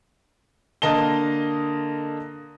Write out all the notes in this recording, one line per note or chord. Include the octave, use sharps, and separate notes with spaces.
D3 A#3 D#5 A5 G7